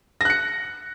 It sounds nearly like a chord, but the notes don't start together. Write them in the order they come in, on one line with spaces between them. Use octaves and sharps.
A#6 F#6 C#7